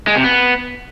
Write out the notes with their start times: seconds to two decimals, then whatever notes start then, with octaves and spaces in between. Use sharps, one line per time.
0.07 G#3
0.16 C3
0.24 B3